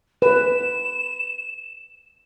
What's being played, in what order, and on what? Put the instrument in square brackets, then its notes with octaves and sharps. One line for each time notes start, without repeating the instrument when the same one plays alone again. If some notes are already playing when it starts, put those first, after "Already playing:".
[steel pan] B4 [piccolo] E7